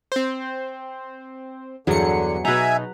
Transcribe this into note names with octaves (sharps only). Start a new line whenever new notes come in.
C4 C5
E2 G2 D3 F#3 G#4 C#7
B2 D#4 B4 E5 G#5 A#5